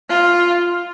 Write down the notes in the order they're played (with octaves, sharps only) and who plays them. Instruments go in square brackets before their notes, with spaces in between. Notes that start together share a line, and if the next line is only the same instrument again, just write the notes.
[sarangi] F4